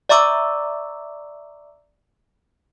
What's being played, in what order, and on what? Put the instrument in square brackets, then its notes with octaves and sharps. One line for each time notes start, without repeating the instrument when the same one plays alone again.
[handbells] D5 E5 A#5 C#6 D6 E6